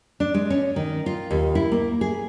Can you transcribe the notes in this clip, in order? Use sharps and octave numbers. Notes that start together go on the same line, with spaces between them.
D4
G#3
C#4
D#3
F4
D#2
E4
A#3
G#4